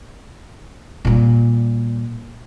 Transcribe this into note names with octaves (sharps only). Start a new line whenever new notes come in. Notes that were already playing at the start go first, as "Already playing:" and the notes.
A#2 G3